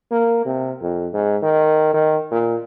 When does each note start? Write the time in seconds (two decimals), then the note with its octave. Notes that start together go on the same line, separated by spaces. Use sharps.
0.11 A#3
0.45 C3
0.82 F2
1.13 G#2
1.42 D#3
1.94 D#3
2.31 A#2